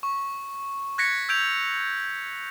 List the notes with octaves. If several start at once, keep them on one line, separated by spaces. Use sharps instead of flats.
C#6
F#6 G#6 A#6 B6 C#7
E6 G6 G#6 D7 F7